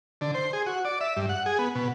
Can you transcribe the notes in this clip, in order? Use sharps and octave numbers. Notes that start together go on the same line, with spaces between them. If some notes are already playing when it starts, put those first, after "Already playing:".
D3
C5
G#4
F#4
D5
E5
G2
F#5
G#4
B3
B2